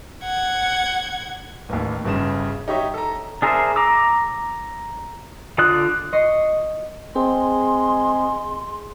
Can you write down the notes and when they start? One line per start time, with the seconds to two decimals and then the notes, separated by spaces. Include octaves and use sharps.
0.22 F#5 G#6
1.69 A1 D#2
2.05 G1 G2 C#3 E7
2.68 D#4 G4 C#5 E5
2.94 A4 A#5
3.42 D4 G#4 A#4 C5 E5
3.76 A#5 D6 E6
5.58 D3 F4 D5 D#6 F#6
6.13 D#5 C#6 A#6 C7
7.16 G#3 C4 G#4 C6